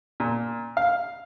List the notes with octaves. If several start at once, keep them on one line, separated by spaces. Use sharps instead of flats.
A#2
F5